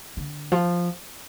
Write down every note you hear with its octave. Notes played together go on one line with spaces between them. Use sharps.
D3
F3